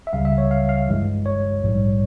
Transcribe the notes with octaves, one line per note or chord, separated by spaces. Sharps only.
E5
C#2 C#3 G3 F5
E5
C#5
F5
F5
G1 G2 E3 G#3
C#5
A#1 G#2 G3